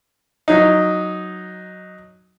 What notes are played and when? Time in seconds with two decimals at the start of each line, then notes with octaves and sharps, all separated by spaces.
0.48 F#3 D#4